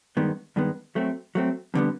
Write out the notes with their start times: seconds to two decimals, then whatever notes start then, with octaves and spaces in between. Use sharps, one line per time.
0.17 G2 D#3 G#3 B3
0.56 G2 D#3 G#3 B3
0.95 F#3 A3 C4
1.35 F#3 A3 C4
1.74 F2 D3 G3 B3